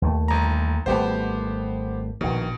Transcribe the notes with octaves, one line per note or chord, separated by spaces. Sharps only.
D#2 A3
G1 A#5
G#1 G3 A3 B3 G4 C5
A#1 B2 D#3